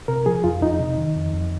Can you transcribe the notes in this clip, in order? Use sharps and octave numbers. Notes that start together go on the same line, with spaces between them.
C3 A#4
F3 G#4
F2 F4
F2 D#4
C3
D#3
F2
F2